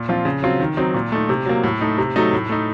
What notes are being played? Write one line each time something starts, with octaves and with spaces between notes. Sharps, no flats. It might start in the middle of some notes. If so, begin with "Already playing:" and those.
Already playing: A#2
F3 C4 F4
C#3
F#3 C4 F4
D#3
F#3 C4 D#4
A#2
A3 D#4
C3
F#3 A#3
A2
A3 D#4
C3
F#3 A3 D#4
A2
A3 D#4